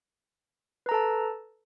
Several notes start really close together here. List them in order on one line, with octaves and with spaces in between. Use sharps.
B4 A#5 A4 A5